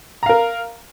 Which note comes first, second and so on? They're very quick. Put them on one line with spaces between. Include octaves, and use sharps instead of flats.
A#5 F5 A#4